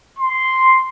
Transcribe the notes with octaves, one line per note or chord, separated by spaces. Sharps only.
C6